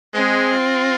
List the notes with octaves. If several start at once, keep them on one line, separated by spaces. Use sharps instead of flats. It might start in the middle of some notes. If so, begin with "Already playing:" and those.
G#3 C4
F4